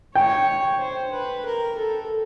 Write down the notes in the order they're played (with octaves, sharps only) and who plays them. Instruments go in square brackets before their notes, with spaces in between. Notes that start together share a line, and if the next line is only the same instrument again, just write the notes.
[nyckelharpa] C#5 [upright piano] G5
[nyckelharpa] C5
B4
A#4
A4